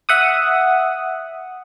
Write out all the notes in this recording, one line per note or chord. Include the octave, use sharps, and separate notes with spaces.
E5 F#5 D#6